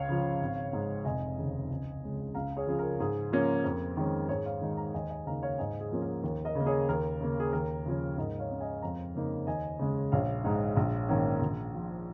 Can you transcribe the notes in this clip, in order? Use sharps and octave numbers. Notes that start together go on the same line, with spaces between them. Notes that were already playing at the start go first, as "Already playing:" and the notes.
Already playing: C#2 C#5 F5
C#3 F3
G#1
G#2 G#3
F1 D#5 G#5
D#2 C#3
C#2
C#3 G#3 C#4
C#2 F5 A#5
G#4 C#5
C#3 F3 C#4 G#4
A#4
G#2 G#4
F3 A#3 C#4
F2 A#4
D#3 G#3 C#4
G#2 G#4 C#5
C#5 F5
D#3 G#3 D#4
F5 A#5
D#2 D#5 G#5
D#5 G#5
C#3 A#3 D#4 F5 A#5
C#5 F5
G#2 D#5 G#5
G#4
F3 A#3 C#4
A#4
D#2 A#4
A#4 D#5
C#3
A#3
G#4 C#5
D#2 A#4
C#3 A#3
G#4
D#2 A#4
C#3 F3 C#4
G#2 A#4 D#5
C#5 F5
G#3 C#4
D#5 G#5
F2 F5 A#5
C#3 A#3 D#4
D#2 D#5 G#5
C#3 G#3 C#4
A#1 C#5 F5
G#2 G#3 D#4
A#1
G#2 D#3 A#3 C#4
A#1
A#2 F3